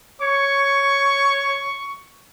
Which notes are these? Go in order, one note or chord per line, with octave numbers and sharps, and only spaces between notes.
C#5 C#6